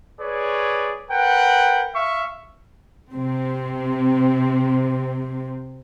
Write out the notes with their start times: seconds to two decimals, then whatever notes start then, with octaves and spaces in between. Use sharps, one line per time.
0.20 G#4 B4 C#5 D5
1.11 A#4 B4 F#5 G5
1.95 E5 F5 C#6
3.13 C3 C4